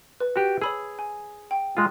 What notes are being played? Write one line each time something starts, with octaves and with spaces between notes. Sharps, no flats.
B4
F#4 G4
G#4 C#5 B5 E6
G#5
G5
G#3 F4